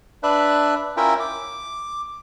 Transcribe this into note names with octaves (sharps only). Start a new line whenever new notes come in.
D4 B4 D5 E5 F#6
C#4 E4 F4 A#4 E5 G5
D6